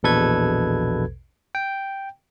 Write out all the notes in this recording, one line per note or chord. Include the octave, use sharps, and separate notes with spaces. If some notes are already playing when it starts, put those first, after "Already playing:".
A#1 E2 B2 A4 B4 G#6
G5